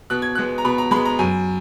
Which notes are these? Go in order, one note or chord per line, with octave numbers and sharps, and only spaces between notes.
B2 F#6
G#6
G#3 B3 F#6
A#5
B2 B5
A#5
G#3 B3 B5
A#5
F#2 G#5